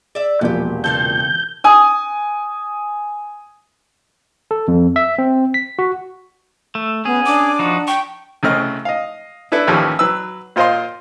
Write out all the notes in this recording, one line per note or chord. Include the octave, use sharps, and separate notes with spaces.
G#4 D5 E5
E1 A#2 F3 B3 G4
C#3 E3 C4 A4 F5 A5 G6
G#5 D#6
A4
F2
E5
C4
B6
F#4
A3
B3 C#4 G#4
D4 D6
F3 D#4 F#4
G5 C#6
C2 C#3 A3 C4 D#5 F6
D#5 F5
D4 E4 A4 B4 E5
A1 D#2 E3 F3 C#4 G4
F#3 B4 E6
A#2 F4 C5 D#5 F5 C6